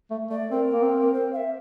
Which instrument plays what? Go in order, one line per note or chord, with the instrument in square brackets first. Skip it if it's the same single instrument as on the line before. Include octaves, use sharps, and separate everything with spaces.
[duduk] A3
[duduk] A3 [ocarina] D5
[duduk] C4 [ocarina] A#4
[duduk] A#3
C4
[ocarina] C5
F5
E5